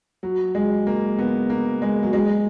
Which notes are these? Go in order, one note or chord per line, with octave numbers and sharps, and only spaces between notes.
F#3
G#3
A#3
B3
A#3
G#3
F#3
G#3